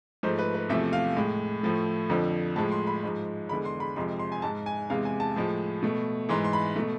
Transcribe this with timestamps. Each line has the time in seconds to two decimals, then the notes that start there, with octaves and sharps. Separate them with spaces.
0.23 G#2 F3 A3 C5
0.39 B4
0.55 B4
0.69 E2 C3 F3 A3 E5
0.93 F5
1.16 A2 G#3
1.63 A2 F3 A3
2.10 F2 D3 F3
2.56 A2 F3 G#3 A5
2.72 C6
2.87 B5
3.03 G#2 F3 G#3
3.49 E2 D3 G#3 B5
3.65 C6
3.80 B5
3.96 F2 C3 F3 G#3 C6
4.19 C6
4.32 G#5
4.42 G#2 G#3 A5
4.66 G#5
4.90 E2 C3 G#3 F5
5.05 G#5
5.20 A5
5.36 A2 F3 G#3
5.83 B2 A3
6.29 G#2 E3 G#3 C6
6.44 C6
6.53 B5
6.76 B2 A3